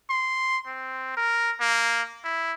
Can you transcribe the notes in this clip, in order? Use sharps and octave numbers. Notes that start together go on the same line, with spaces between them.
C6
C4
A#4
A#3
E4